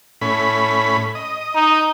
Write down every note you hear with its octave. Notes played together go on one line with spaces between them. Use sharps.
A2 C#4 B5
D#5
D#4